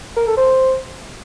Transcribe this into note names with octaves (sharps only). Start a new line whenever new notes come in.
A#4
A4
C5